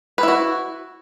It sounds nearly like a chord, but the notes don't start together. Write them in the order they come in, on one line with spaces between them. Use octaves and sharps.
B4 E4 F#4